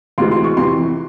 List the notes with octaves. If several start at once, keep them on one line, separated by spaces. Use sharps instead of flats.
D2 C3 E3 G#3 C6
C6
C#6
F2 C3 E3 C6